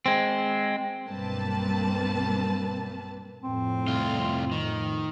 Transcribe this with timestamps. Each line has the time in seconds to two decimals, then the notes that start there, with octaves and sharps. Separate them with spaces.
0.06 G#3 C4
1.06 B1 G2 A#3 C4 B4 A5
3.43 F2 A2 C4
3.87 C2 F4
4.51 D#3